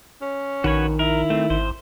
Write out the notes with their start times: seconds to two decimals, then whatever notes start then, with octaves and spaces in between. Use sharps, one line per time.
0.21 C#4
0.64 A#1 D#3 F#4 B4 C#5
0.99 E4 A#4
1.30 A3 C4
1.50 G#1 C5